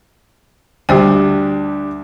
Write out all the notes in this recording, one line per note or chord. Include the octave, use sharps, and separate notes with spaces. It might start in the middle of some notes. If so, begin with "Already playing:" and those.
D2 G3 D4 G4 C5 G5